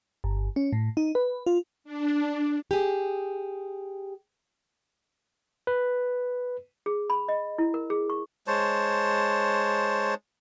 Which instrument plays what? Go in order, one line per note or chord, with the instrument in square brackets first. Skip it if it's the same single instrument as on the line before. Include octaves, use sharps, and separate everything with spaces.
[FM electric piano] G1
C#4
A2
D#4
B4
F4
[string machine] D4
[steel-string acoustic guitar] G4 G#4
[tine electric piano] B4
[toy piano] G#4
B5
D#5
E4
A#4
G#4
C#6
[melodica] G#3 C5 C#5 A5